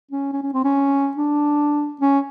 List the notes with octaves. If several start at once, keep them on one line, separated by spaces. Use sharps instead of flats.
C#4
C#4
C#4
C4
C#4
D4
C#4